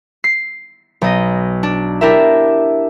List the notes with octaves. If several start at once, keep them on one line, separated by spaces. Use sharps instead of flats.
C7
B1 D#5
D4
D4 E4 G4 A#4 E5